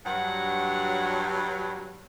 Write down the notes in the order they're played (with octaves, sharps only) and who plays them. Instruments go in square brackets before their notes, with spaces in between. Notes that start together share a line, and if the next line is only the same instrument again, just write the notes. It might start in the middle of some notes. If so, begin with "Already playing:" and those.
[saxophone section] G2 F#3 [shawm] F#5